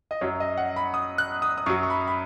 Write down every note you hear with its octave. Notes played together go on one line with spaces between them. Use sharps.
D#5
F#2 F#3 C#5
D#5
F#5
B5
D#6
F#6
D#6
D#6
F#2 F#3 C#6
C#6
B5
B5